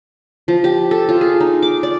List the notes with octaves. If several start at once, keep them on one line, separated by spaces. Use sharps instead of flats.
F3
G4
A4
F4
G#4
D#4
D6
D5